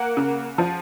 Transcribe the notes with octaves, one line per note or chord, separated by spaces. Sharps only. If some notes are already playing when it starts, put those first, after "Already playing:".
Already playing: A#3 F#5
C#3
F3